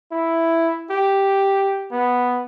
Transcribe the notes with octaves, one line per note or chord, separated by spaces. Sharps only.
E4
G4
B3